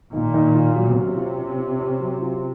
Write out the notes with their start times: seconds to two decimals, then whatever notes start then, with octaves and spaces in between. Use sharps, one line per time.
0.13 A#2 D#3
0.34 D#3
0.55 F4
0.76 F#3
0.96 C3 C#4
1.17 F4
1.38 C#4
1.59 F4
1.79 C#4
2.00 F#3
2.21 F4